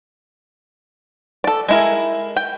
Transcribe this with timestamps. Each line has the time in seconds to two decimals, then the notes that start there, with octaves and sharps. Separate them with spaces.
1.44 A4 D5
1.68 G#3 E4 A#4
2.36 G5